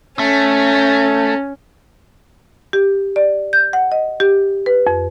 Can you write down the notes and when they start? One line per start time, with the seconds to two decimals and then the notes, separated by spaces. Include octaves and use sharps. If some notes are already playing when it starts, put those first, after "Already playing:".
0.19 A3 C#4
2.73 G4
3.16 D5
3.53 G6
3.73 F#5
3.92 D#5
4.20 G4
4.66 B4
4.87 F2